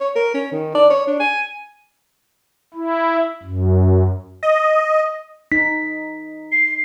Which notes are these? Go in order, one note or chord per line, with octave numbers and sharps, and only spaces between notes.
C#5
A#4
C#4
D#3
D5
C#5
D4
G#5
E4
F#2
D#5
D#4 B6
C7